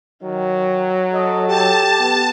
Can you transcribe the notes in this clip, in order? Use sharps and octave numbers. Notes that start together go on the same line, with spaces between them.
D#3 F#3
A4 D#5
G4 A5
B3